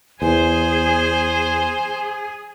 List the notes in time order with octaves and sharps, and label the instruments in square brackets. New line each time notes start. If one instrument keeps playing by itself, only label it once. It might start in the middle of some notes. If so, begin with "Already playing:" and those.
[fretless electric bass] E2 [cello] G#4 [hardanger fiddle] C5 [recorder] G#5